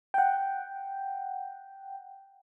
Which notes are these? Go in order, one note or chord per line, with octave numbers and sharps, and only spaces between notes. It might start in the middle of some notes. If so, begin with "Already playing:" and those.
F#5 G5